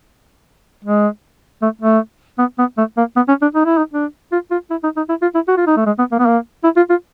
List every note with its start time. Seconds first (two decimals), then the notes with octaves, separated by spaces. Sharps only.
0.84 G#3
1.62 A3
1.81 A3
2.39 B3
2.59 B3
2.78 A3
2.97 A#3
3.16 B3
3.29 C#4
3.42 D4
3.55 D#4
3.66 E4
3.77 D#4
3.94 D4
4.32 F4
4.51 F4
4.71 E4
4.84 D#4
4.97 D#4
5.09 E4
5.22 F4
5.35 E4
5.48 F#4
5.57 F4
5.67 D#4
5.77 A3
5.86 G#3
5.99 B3
6.12 A#3
6.19 B3
6.26 A#3
6.64 E4
6.77 F4
6.90 F4